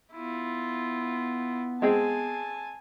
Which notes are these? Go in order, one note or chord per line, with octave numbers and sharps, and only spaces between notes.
B3 E4 F4
G#3 C4 G#4 G#5 A5